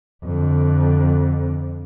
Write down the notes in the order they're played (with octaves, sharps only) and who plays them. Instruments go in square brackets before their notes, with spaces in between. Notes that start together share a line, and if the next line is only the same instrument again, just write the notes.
[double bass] F2 D3